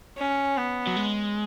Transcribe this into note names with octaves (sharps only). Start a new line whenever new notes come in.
C#4
B3
F#3
G#3